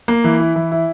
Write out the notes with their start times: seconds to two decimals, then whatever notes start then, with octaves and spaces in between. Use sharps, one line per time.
0.08 A#3
0.24 E3
0.39 E4
0.56 E3
0.72 E4